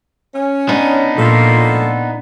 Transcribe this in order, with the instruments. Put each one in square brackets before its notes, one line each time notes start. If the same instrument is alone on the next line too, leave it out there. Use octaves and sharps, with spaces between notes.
[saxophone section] C#4
[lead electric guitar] B3 D#4 [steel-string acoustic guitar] D4
[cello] A#2 [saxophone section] F3 A4